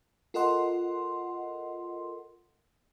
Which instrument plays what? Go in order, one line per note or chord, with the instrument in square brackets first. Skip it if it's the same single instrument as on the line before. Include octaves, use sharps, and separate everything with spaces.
[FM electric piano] F4 A4 A#4 D#5 F#5 C6